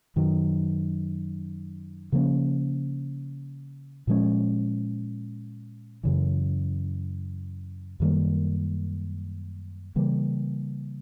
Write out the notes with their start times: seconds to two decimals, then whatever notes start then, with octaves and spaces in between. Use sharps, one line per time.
0.16 F#2 D#3 F#3
2.12 C#3 F3 A#3 C#4
4.07 A#2 F3 G#3 C#4
6.03 F#2 C#3 E3
8.00 F#2 D#3 G3 A#3
9.96 C#3 E3 G3 A#3